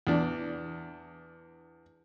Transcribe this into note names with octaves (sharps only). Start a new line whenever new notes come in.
E2 D4